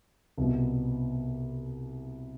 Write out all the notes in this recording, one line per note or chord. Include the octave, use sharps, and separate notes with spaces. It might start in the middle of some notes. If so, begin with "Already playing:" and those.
C2 B2